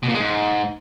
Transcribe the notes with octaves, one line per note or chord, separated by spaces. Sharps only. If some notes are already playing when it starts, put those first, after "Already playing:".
B2
A#2
G#3
G#2